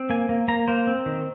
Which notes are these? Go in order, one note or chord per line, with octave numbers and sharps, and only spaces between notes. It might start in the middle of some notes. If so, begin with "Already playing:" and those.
Already playing: C4
A#3 G#5
A#3
A#3 A#5
A#3 C5
C4
D#3